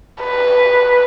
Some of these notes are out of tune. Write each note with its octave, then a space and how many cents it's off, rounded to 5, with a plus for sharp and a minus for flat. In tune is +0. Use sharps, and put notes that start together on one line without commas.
B4 +0